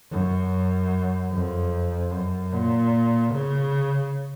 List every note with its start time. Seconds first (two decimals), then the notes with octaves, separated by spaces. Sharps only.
0.11 F#2
1.31 F2
2.11 F#2
2.53 A#2
3.32 C#3